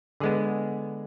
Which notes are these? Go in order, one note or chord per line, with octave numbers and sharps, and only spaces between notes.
D3 G#3 B3 G#4